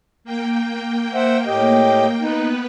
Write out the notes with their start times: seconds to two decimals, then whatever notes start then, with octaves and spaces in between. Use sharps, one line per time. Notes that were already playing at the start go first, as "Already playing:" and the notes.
0.24 A#3 G5
1.15 C5 E5 F#5
1.47 A2 G4 D#5
2.21 B3 D#4 B4